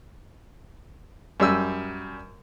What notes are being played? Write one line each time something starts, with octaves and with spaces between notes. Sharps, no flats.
F#2 G3 E6